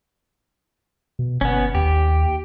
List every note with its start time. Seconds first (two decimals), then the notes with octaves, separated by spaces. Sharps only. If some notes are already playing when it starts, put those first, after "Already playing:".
1.19 B2
1.41 G1 B3 C#4
1.75 D#2 G4